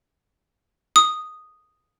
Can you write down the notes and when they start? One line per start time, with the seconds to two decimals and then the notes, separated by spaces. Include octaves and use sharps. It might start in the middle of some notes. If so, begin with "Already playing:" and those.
0.96 D#6